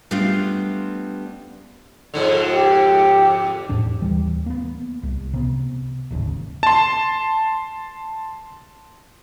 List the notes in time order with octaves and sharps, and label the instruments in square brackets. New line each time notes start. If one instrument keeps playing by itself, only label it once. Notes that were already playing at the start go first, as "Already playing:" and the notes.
[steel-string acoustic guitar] G3 A3 B3 C4 D4 F4
[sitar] F2 G#2 D3
[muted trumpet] G4
[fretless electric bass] E2 A2 D4
D#2 E3 G3
A#3 B3
C2
C3 B3
D1 G#1 D#2 C#3
[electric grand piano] A5 C6